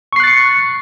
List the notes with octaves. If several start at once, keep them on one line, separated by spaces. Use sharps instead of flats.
C#6 F#6 A6 C7 C#7